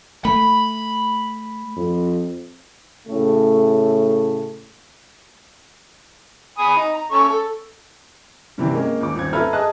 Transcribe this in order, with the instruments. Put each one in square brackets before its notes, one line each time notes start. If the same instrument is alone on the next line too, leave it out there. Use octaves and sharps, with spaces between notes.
[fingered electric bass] A3 [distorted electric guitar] B5
[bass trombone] F2
[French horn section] A2 C#3 A3
[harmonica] G#5 B5 D#6
D#4
A#5
C#4 A4 C#6
A4
[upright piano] G2 C3 E3 C4
G#3 A#3 C#4
D#1 D6
D#1 C4 G#6
A4 B4 E5 A#5 F6 G#6
G#4 D#5 A5 D#6 F#6